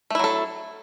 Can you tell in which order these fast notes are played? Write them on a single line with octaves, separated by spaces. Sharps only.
A3 E4 F#3 A4